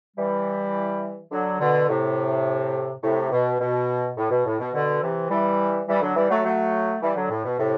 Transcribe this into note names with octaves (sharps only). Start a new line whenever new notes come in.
E3 G3
D3 F#3
B2 D3
A2 C3
A2 C3
B2
B2
A2
B2
A2
B2
B2 D3
C3 E3
E3 G3
E3 G3
D3 F#3
E3 G3
F#3 A3
F#3 A3
E3 G3
D3 F#3
A2
B2
A2 C3